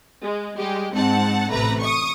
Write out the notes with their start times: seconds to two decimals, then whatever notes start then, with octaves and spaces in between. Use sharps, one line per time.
0.23 G#3
0.58 G3 G#3 G4
0.93 G#2 C4 F#5 A5
1.52 A1 C3 A3 B4 A#5
1.80 C#6 D#6